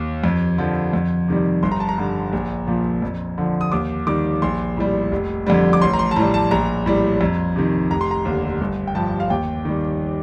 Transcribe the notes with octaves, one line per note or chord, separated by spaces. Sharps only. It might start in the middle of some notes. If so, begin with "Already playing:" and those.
Already playing: D#2
F2
D3 F3
F2
C3 D#3 G3
G1 C6
A#5
A5
A#5
G2 D3
A#1
A#2 F3
F2
D3 F3
D#6
D#2 D6
D#3 G3 D6
A#1 C6
A2 G3
F1
F2 D3 G3
D6
A1 C6
A#5
C6
A5
A2 G3 A#5
A5
A#1 A#5
A2 G3
F2
C3 D#3
F1 A#5
C6
A#5
D#2 D3
G1
G5
G2 F3 A5
F5
D#2 G5
D#3 G3